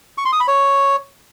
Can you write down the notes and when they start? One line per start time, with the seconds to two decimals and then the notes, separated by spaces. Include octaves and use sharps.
0.18 C#6
0.25 C6
0.33 D#6
0.40 B5
0.48 C#5